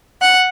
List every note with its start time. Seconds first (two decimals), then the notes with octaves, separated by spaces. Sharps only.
0.21 F#5